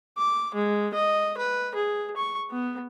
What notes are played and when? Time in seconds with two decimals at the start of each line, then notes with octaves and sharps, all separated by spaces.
0.18 D6
0.54 G#3
0.94 D#5
1.37 B4
1.75 G#4
2.17 C#6
2.50 B3